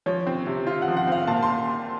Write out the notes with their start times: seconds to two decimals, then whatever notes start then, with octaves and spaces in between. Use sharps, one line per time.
0.06 F3 C#5
0.27 C4
0.46 C3
0.67 F4
0.82 F#5
0.88 F3
0.97 F#5
1.07 C4 F5
1.27 A#2 A5
1.43 C6